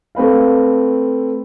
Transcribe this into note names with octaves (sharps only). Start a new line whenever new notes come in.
A3 C4 B4 F5